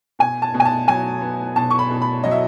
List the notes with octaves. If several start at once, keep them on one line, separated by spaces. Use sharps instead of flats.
B2 G#5
A5
B2
G#5
A5
F#3 G#5
B3
B2 A5
C#6
B5
B2
B5
F#3 D#5
E5